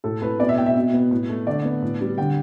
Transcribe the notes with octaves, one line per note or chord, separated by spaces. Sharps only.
A2 A4
A2 B4
B2 D5
E5
B2 G5
E5
B2
B3
A2
A3
D3 D5
B3
A2
G3
D3 G5